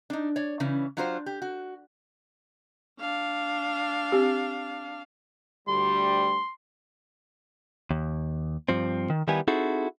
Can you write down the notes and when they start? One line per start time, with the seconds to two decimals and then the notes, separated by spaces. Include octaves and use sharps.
0.10 D4 D#4
0.36 C#5 D5
0.60 C#3 E3 C#4
0.97 F#3 D4 F4 F#4 A#4 C5
1.26 G4
1.42 F#4
2.99 D4 F5
4.12 C4 G4
5.68 D2 G3 C6
7.91 D#2
8.69 G2 F3 C4
9.10 D#3
9.28 D#3 G3 B3 E4 G4 G#5
9.48 C4 D#4 E4 F#4 G#4 A4